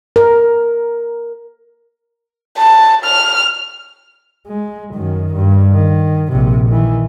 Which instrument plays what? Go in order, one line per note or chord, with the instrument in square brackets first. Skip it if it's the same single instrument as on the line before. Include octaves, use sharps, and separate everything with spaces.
[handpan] A#4
[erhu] A5
F6
[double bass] G#3
F#2 D#3
G2
D#3
A#1 C3
D#3 E3